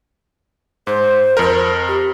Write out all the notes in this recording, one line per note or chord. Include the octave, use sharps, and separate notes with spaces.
G#2 C5
F2 A#4
G4